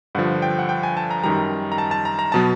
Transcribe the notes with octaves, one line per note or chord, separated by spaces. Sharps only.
G2 D3 F3 F#5
G5
F#5
G5
G#5
A5
A#5
F#2 D#3 G3 A#5
A#5
A5
A5
A#5
A#5
B2 F#3 B3 A5